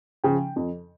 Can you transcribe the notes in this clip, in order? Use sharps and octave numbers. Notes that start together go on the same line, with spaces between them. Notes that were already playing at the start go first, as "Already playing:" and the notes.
C#3 F3 G5
F2